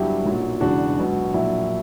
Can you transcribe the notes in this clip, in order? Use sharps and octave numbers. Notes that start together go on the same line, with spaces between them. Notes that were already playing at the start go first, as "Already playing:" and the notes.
Already playing: G1 G2 F#3 E4 G4
B1 A#2 F#3
E1 E2 C#3 D4 F#4
C#2 B2 F#3
A#1 A#2 F#3 E4